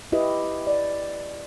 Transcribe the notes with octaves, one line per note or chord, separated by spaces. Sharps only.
E4 G4 B4 D#5
D5